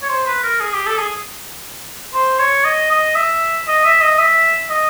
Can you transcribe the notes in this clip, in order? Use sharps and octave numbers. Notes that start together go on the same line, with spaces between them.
C#5
C5
B4
A#4
G#4
G4
A4
G#4
C5
C#5
D#5
D#5
E5
D#5
E5
D#5
E5
D#5